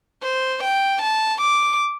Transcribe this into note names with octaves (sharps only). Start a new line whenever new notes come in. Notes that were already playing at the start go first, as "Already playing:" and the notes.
C5
G5
A5
D6